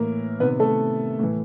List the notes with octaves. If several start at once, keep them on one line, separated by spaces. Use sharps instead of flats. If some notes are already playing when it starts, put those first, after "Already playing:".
Already playing: A2 E3 A#3 A#4
C3 D#3 B3 B4
A3 A4
A2 E3